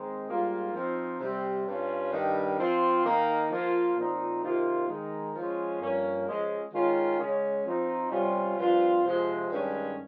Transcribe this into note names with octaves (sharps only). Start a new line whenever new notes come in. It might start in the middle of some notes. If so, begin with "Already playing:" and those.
Already playing: D#3 G#3 C4 D#4
G#2 G3 A#3 F4
F3 C4 D#4
C3 G3 C4
G2 G3 C#4 F4
G2 D#3 G3
F3 C4 F4
D#3 A#3 D#4
F3 A#3 F4
A#2 F3 C4 D#4
C3 D#3 A#3 F4
D#3 G#3 D#4
F3 G#3 C#4 F4
G2 F3 A#3 C#4
F3 G#3 C#4
D#3 G#3 C#4 F4
C#3 G#3 C#4
F3 C4 D#4
C3 G3 C#4 F4
G2 F3 C4 F4
C3 F3 G#3
G2 D#3 G#3 C#4